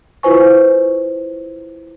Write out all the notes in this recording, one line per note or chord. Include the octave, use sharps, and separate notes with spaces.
E4 F4 B4 C5 G#5 C#6